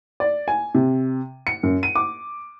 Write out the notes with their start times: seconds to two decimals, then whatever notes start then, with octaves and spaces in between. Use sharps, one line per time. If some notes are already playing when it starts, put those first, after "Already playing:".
0.20 D5
0.48 G#5
0.75 C3
1.47 C#7
1.63 F#2
1.83 D#7
1.96 D6